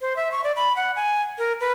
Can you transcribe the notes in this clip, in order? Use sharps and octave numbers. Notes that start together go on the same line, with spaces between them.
C5
E5
C#6
D5
B5
F#5
G#5
A#4
B4